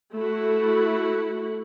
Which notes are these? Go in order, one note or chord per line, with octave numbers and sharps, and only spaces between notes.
A3 E4 F#4